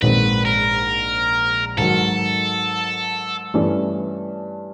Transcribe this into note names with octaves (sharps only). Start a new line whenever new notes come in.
A#1 G#2 D#3 G#3 C4 B4
A#4
G#2 D#3 F#3 A4
G2 E3 A3 C#4